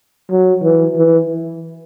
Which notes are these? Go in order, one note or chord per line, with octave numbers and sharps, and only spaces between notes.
F#3
E3
E3